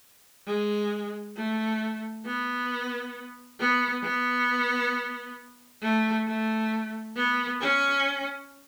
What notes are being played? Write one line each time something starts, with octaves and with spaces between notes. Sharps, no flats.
G#3
A3
B3
B3
B3
A3
A3
B3
C#4